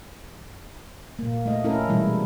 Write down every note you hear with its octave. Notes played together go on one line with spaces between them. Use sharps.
A#2 A#3
A3 D#5
A3 C#4 E4 A4 A#4
B2 E3 G3 G#3 E4